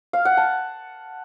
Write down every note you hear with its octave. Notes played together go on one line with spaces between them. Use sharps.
F5
F#5
A5